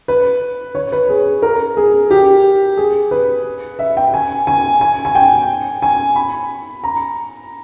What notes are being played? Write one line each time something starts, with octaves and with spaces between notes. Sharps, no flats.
B4
C#5
B4
G#4
A#4
G#4
G4
G#4
B4
E5
G5
G#5
G#5
G#5
G#5
G5
G#5
B5
A#5